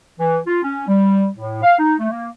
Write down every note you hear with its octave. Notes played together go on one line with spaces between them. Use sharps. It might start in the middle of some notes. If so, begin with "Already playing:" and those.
E3
F4
C#4
G3
A2
F5
D#4
A3
A#3